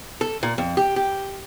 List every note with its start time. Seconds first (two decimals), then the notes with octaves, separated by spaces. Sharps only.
0.21 A4
0.43 A#2
0.58 F2
0.77 G4
0.96 G4